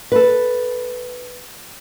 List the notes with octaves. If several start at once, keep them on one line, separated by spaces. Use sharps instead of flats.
A4 B4